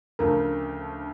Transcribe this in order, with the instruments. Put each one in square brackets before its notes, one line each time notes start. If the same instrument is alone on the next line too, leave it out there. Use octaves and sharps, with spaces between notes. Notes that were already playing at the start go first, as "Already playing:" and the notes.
[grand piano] D2 C#3 F3 A3 [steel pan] A#4